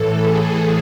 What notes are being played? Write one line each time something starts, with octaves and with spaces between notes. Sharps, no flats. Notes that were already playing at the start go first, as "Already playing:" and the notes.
Already playing: A2 E3 A4
G#4